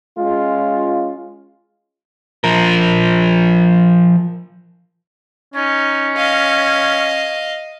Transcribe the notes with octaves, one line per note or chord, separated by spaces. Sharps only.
G#3 C#4 F4
F3 A#4
C#4 D#4
D#5 F5